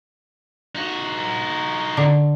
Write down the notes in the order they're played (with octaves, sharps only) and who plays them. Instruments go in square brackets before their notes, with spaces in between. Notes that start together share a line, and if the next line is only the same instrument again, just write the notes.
[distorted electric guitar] D#4 F#4
[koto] D3